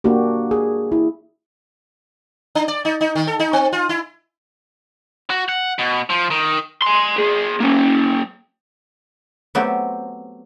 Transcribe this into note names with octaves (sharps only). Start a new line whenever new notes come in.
A#3 D4 F#4 G4
G#4
E4
D4
D5
D#4
D#4
D#3
A4
D#4
C4
F4
E4
F#4
F#5
B2
F3
D#3
G#5 C6
A#3 G#4
A#3 C#4
F#3 A3 B3 C4 G4